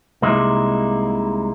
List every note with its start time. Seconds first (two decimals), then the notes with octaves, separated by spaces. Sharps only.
0.22 C2 C3 G#3 A#3 D#4 E4